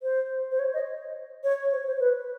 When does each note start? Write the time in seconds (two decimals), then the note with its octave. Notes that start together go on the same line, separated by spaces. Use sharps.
0.03 C5
0.51 C5
0.59 C#5
0.74 D#5
1.44 C#5
1.72 C5
1.87 C5
2.00 B4